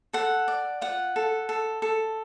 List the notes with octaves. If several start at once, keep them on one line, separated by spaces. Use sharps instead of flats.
A4 F#5
D5
F4 F#5
A4
A4
A4